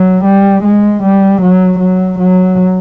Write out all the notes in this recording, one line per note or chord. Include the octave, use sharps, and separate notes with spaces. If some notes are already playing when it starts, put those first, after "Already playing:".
Already playing: F#3
G3
G#3
G3
F#3
F#3
F#3